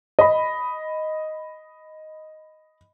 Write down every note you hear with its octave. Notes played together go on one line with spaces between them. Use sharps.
D#5 B5